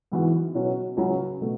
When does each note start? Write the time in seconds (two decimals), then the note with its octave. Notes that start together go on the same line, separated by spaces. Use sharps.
0.12 G#2 E3 G#3 B3 F#4
0.54 B2 F#3 C#4 F#4
0.97 C#2 C#3 F#3 C#4
1.41 B2 A3